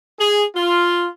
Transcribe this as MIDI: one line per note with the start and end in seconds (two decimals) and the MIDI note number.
0.19 0.43 68
0.55 1.05 65